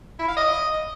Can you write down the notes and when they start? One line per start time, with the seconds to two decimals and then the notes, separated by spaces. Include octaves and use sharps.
0.19 E4
0.28 F5
0.36 D#5